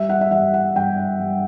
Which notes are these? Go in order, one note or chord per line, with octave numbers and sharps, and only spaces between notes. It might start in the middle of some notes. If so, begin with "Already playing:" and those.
Already playing: G3 E5
F#5
E5
G2 F#5
F#5
G2 G5
G2